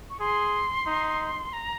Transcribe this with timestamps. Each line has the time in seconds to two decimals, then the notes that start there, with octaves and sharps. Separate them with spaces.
0.10 C#6
0.20 G#4 C6
0.87 D#4
1.53 A#5